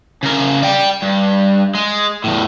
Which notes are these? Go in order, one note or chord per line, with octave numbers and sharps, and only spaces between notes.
C#3 A#4
D5 G5
G2
G#3
E2 A2